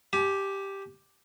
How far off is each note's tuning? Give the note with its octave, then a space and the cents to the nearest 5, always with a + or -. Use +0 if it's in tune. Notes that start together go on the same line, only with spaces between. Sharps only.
G4 +0 G#5 +45